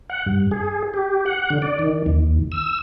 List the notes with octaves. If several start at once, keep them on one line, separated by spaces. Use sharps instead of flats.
F#5
G2
G#4
G4
F#5
D3
D5
D#3
D#2
E6